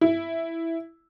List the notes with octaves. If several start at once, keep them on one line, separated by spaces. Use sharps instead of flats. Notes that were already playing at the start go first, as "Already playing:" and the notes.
E4